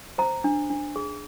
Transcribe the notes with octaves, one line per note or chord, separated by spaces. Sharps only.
C5 A#5
D4
D4
G#4